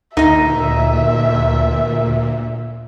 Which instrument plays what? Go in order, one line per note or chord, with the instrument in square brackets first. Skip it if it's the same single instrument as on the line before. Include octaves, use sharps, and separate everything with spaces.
[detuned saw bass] D2 [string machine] A#2 [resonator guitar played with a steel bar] D#4 D#5 [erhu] E5